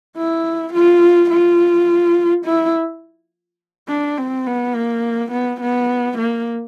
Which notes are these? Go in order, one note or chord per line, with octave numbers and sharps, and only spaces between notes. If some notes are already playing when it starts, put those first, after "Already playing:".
E4
F4
F4
E4
D4
C4
B3
A#3
B3
B3
A#3